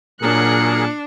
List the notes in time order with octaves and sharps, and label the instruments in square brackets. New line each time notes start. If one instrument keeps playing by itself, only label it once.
[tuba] A#2 [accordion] F#3 G#4 A#4 [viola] D4 [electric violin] F#6 C#7